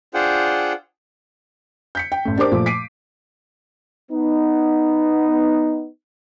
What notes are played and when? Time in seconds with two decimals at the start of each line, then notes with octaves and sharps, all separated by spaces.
0.14 D4 F4 G#4 C5 F#5 G5
1.95 G6 B6 C#7
2.12 G5
2.25 A1 A3
2.37 D4 G4 A#4 C5 D6
2.52 A#2 F3 A3
2.66 B6 C7 D7 D#7
4.12 B3 D#4